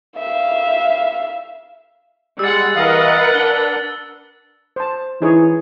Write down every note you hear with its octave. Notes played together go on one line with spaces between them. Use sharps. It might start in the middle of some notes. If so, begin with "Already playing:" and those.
E5 F5
G3 G#3 G#4 F#5 E6 A6
E3 A#4 B4 D#5 F5 F#5
D4 A6 G7
C5 A5
E3 D#4 G#4 C#5